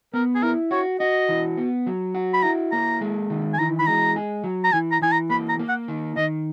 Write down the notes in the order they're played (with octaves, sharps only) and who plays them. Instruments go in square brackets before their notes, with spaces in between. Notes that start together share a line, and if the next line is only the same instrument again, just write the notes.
[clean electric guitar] B3 [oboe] A#4
[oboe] G#4
[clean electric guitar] E4 [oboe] A#4
[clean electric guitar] F#4 [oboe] C#5
[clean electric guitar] F#4 [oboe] D#5
[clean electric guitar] E3
B3
F#3
F#4
[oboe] B5
[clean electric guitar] E4 [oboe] A#5
[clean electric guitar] A#3 [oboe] A#5
[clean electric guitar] G#3
D#3
[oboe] G#5
[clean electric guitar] E3 [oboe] A#5
[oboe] B5
[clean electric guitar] G#3 [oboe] A#5
[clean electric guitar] G#4
F#3
[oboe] A#5
[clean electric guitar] E3 [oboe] G#5
[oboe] A#5
[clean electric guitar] E3 [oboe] G#5
[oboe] A#5
[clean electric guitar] A#3 [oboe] B5
[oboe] A#5
[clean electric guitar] A#3
[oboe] F#5
[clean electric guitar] D#3
[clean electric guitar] D#3 [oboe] D#5